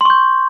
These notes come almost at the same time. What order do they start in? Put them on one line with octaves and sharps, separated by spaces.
C6 C#6 G6